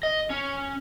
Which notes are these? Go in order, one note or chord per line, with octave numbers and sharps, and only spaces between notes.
D#5
C#4